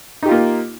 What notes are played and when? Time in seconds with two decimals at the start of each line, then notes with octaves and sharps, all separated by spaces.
0.23 D#4
0.26 G4
0.29 F4
0.31 A#3